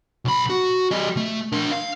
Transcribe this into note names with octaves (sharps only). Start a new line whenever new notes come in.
B1 B5
F#4
G3 D#5
A3
D4 A#4
F5